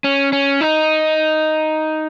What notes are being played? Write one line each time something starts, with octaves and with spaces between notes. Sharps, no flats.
C#4
C#4
D#4